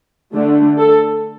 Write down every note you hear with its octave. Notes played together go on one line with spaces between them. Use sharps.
D3 A3 D4
A4